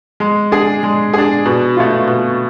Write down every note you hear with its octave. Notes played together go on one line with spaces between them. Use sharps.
G#3
D4 G#4
G#3
D4 G#4
B2
A3 F4
B2